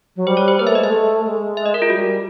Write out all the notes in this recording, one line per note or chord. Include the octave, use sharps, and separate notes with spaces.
F#3
G3 C5
C#5
C5
A#3 B4
A3 E5
D#5
G#3 E5
A3
G#3
E5
D#5
A#4
F4
G3 F#4